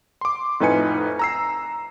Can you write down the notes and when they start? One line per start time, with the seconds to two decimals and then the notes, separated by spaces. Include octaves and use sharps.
0.21 C6 D6
0.60 F2 A2 D#4 B4 G#5 C#7
1.19 A#5 E6 C7